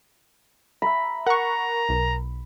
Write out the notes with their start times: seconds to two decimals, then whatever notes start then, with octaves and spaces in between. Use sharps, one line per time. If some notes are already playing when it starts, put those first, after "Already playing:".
0.82 E5 A#5 B5
1.27 A#4 F#5 A#5 C#6
1.89 B1